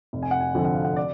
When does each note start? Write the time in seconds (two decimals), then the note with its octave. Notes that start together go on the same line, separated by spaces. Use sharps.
0.13 F1
0.23 G#5
0.31 F#5
0.40 G#5
0.55 F2 D3 F3 G#5
0.65 F#5
0.74 F5
0.85 F#5
0.96 D5